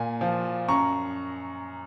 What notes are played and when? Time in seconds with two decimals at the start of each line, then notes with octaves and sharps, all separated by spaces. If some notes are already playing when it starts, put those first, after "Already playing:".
Already playing: A#2 G#5
0.21 F3
0.68 F#2 A#5 C#6